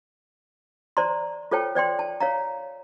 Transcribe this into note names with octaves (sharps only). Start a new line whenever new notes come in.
C5 D5 A5 A#5 C6
F4 A4 C5 C#5 G5 A5
C5 D5 G5 C6
A5
C#5 F5 A#5